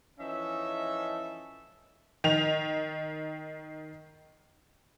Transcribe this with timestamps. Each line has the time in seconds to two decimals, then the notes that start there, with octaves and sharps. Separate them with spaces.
0.19 E3 F3 C#4 D#4 A4 E5
2.24 D#3 F7